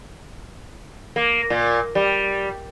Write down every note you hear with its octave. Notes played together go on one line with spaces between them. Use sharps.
A#3
A#2
G3